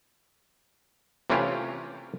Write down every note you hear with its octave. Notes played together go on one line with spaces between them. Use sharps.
C3 E3 A3 C#4 F4 G4